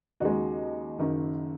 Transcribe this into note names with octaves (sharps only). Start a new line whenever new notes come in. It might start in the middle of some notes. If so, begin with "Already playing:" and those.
D#2 C#3 G#3 D#4 F#4
F#1 F#2 D#3